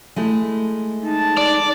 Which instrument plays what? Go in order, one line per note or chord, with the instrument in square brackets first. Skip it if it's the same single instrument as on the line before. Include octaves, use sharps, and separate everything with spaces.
[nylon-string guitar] G#3 A3 E4
[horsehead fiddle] D#4 A5
[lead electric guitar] D5